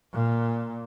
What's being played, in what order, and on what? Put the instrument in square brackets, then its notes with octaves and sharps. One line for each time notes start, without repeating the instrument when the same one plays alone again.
[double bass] A#2